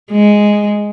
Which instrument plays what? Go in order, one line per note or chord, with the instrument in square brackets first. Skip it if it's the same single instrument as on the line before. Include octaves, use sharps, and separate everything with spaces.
[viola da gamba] G#3